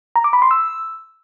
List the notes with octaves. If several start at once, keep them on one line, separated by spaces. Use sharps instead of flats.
A#5
D6
B5
C6
E6